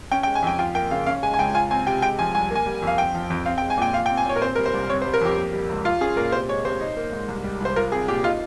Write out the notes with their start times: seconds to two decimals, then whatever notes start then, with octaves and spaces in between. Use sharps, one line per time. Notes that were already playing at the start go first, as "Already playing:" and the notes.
0.11 C#4 G5
0.23 G5
0.27 G#3
0.35 G#5
0.43 F2 G5
0.59 F4 G5
0.75 A#3 G5
0.91 C#3 F5
1.06 C#4 F5
1.23 G#3 G#5
1.34 G#5
1.38 C#2 G5
1.54 F4 G#5
1.71 C4 G#5
1.86 C3 G5
2.02 G#3 G5
2.19 F3 G#5
2.35 C2 G#5
2.50 A#3
2.55 G#5
2.66 G3
2.82 F2
2.87 F5
2.98 C4 G5
3.14 F3
3.30 F2
3.46 C4 F5
3.58 G5
3.62 G#3
3.70 G#5
3.77 A#2 G5
3.93 F4 F5
4.06 G5
4.10 C4
4.17 G#5
4.25 A#2 C#5
4.36 A#4
4.42 C4 C5
4.55 G3 A#4
4.66 C5
4.74 C2
4.90 C4 C#5
5.02 C5
5.05 G3
5.14 A#4
5.21 F2 G4
5.37 A#3
5.53 G3
5.69 C#2
5.85 F4
6.01 C#4 G#4
6.17 A#2 A#4
6.32 C3 C5
6.49 G#3 C#5
6.65 C3 C5
6.81 D#4
6.97 A#3
7.13 G#2
7.28 C2
7.44 G3
7.60 C2 C5
7.76 F4 A#4
7.92 C4 G#4
8.08 A#2 G4
8.24 D#4 F4